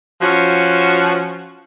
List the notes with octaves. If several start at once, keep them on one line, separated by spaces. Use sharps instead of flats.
F3 C#4 F#4